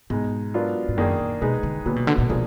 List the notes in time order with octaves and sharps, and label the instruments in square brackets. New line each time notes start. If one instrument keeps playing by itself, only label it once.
[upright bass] G#2 [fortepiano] B2 G#3 D#4
[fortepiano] F#3 B3 D4 F4 A#4
[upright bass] G#2
[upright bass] F#2 [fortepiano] D#3 A#3 D4 G#4
[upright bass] A#2
[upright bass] B2 [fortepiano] G#3 D#4 G#4 B4
[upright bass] D3
[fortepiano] A#2 F#3 B3 [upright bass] D3
[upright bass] B2
D3
A#2
[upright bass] B2 [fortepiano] F3 A#3 D4 G#4